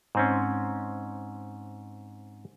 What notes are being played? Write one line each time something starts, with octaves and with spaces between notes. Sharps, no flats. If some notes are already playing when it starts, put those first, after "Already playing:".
G#2 C4 C#4